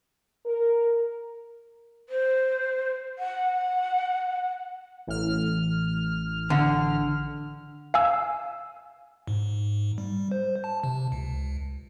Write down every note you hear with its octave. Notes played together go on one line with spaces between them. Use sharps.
A#4
C5
F#5
A1 F6
D3
F5 G#5 E6
G#2
G3
C5
A5
C3
C#2